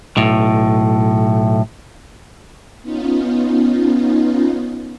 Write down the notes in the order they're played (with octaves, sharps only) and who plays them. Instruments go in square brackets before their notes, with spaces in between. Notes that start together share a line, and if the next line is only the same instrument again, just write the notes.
[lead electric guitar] B1 A2
[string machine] B3 C#4 D#4 F4